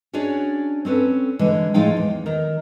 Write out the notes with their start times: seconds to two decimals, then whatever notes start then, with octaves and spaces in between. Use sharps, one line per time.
0.13 C#4 D4 F#4 G#4 C#5 D5
0.85 C4 C#4 A4 B4
1.39 D3 E3 G#3
1.74 A2 F3 G#3 D#4 F5 G5
1.97 E2
2.26 D#3 A#4